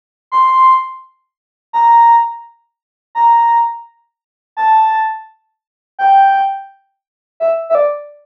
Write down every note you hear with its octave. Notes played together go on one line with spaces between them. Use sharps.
C6
A#5
A#5
A5
G5
E5
E5
D5